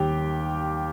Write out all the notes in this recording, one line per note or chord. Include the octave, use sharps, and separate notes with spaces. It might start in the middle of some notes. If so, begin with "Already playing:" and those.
Already playing: D#2 D#3 G3 G4 G5